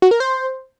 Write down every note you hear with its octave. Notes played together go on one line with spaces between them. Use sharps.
F#4
A#4
C5